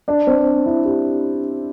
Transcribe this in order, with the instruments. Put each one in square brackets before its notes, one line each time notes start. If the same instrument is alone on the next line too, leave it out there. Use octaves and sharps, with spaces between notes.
[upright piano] D4 D5
C4 C5
E4
G4